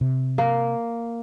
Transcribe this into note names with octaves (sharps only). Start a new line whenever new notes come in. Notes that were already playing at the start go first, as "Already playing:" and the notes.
C3
A#3